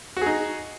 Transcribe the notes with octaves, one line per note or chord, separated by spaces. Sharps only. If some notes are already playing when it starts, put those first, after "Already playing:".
D#4 F#4 G#4